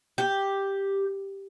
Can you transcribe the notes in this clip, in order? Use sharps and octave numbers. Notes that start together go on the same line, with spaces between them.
G4